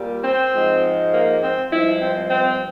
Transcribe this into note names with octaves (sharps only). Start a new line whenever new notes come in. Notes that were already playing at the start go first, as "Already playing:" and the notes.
Already playing: A#2 G3
C4
G#2 F3 G#3
A#3
C4
G2 F3 G#3 E4
C4
C4